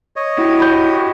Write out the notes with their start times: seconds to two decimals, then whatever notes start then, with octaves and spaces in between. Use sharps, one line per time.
0.16 C#5 D#5
0.38 E4 F#4 G4
0.60 B5 G6